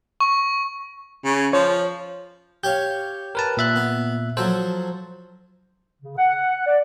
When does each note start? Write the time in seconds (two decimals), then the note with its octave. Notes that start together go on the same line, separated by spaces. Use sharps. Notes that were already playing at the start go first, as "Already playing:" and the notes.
0.20 C#6
1.25 C#3
1.53 F3 C#5
2.63 G4 C#5 F5 G6
3.35 A#4 B4 A5
3.57 A#2 E5 F#6
3.76 B3
4.37 F3 F#3 A4 C5
6.02 C#3
6.18 F#5
6.67 D5